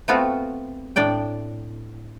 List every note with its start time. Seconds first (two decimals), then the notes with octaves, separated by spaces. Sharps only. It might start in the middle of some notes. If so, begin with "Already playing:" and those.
0.08 A3 B3 C4 F4 F#4
0.96 A2 D4 D5 G5